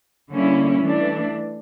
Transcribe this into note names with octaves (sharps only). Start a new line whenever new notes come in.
D3 G3 A#3 C#4 E4
E3 A3 D4